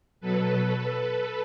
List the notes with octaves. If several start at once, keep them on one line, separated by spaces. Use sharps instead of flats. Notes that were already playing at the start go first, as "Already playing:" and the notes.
B2 F#3 A4 B4